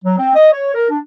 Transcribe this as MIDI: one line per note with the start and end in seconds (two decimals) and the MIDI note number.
0.04 0.18 54
0.18 0.32 60
0.35 0.51 75
0.52 0.71 73
0.75 0.88 70
0.90 0.99 62